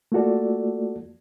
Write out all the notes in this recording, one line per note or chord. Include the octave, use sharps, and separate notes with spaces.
A3 A#3 F4 F#4 A4 D5